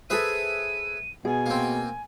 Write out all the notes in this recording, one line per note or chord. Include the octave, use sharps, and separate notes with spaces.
G#4 A4 B4 C5 E5 D#7
B2 G#4 G#5
A#3 C4